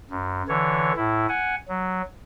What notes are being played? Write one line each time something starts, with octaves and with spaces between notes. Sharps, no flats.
F#2
D3 E3 C#5
A2 E4
F#5 G#5
F#3